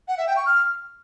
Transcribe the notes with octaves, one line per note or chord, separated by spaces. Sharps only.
F#5
E5
G5
C#6
F6